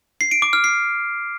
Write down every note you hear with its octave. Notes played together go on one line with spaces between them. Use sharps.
C7
D7
D6
F6
C7